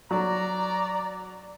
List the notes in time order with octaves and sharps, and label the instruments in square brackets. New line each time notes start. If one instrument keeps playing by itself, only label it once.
[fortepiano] F#3 [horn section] D5 A#5